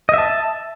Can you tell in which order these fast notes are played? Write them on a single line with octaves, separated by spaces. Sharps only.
D#5 E5 A5